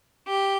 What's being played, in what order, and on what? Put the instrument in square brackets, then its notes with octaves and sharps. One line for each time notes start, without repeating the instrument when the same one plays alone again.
[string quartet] G4